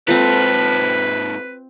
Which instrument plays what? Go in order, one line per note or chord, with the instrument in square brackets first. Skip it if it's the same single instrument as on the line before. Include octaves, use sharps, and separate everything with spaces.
[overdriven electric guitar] G#2 A4 [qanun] C4 F4 [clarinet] B4